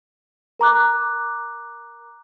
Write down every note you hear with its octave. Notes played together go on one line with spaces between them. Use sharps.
A#4 A#5 D6 F#6